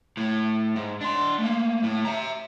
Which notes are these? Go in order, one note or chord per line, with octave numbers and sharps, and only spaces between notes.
A2
G#2
D4 C6
A3 A#3
A2
E5 A#5